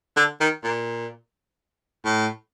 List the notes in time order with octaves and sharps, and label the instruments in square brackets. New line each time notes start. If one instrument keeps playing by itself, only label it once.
[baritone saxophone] D3
D#3
A#2
A2